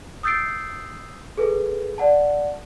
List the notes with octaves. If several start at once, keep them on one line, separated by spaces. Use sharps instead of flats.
D#6 E6 G6 A6 C7 D7
G#4 A4 B4
D5 F#5 A5